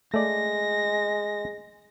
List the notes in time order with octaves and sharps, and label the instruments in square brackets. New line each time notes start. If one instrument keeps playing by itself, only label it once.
[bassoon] G#3 [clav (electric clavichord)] A3 D5 [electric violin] A#6